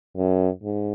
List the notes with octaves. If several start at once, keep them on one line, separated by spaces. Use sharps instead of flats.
F#2
G#2